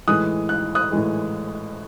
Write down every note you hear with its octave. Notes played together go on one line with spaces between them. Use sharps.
A2 E3 G#3 D#6 F#6
F#6
D#6 F#6
A2 E3 G#3